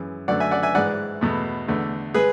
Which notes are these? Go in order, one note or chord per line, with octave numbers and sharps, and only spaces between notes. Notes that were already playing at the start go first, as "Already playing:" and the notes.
Already playing: F#2 E3 G#3
F#2 D3 F#3 A3 D5 F#5
E5 G#5
D5 F#5
E5 G#5
G#2 E3 G#3 D5 F#5
E2 B2 A3
E2 D3 A3
G#3 G#4 B4